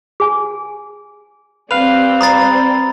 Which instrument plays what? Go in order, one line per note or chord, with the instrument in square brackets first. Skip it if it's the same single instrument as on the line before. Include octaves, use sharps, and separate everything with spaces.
[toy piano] G#4 G#5
[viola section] G3 C4 D5 [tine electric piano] B4 F5 [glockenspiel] F7
[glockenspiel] A#5 B5 A6 [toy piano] D#6